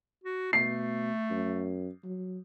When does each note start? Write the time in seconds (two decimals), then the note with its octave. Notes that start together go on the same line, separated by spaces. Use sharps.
0.24 F#4
0.53 B2 A3 C7
1.31 F#2
2.04 F#3